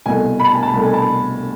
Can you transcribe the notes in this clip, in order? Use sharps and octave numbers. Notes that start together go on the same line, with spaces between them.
C2 B2 A3 G#5
B5
A5
G#5
A5
C2 B2 A3 A5
G#5
A5